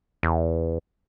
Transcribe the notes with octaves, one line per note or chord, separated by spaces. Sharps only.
E2